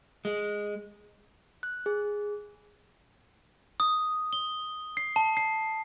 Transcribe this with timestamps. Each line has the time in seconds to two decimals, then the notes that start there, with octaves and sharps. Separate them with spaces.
0.25 G#3
1.63 F#6
1.86 G#4
3.80 D#6
4.33 G7
4.97 C7
5.16 A5
5.37 C7